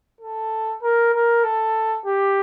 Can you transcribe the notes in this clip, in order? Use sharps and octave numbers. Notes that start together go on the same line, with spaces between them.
A4
A#4
A#4
A4
G4